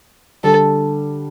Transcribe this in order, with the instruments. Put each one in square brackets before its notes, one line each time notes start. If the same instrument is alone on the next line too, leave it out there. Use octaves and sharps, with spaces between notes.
[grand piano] D3 G3 D4 [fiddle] A4